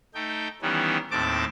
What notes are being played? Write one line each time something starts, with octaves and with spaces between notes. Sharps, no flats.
A3 D#4 G5
D#3 E3 G3 B3 C#4
D#2 A2 C4 A5 D6